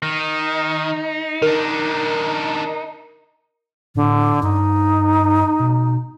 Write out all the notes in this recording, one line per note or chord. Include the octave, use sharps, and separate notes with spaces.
D#3 D#4
D#3 D4 A#4
A2 D3
G2 D#4
B2